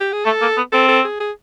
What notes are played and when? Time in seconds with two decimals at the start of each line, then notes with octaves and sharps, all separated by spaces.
0.01 G4
0.13 G#4
0.25 A3 A4
0.41 A#3
0.57 B3
0.72 C4 A4
0.88 A4
1.04 G#4
1.20 G#4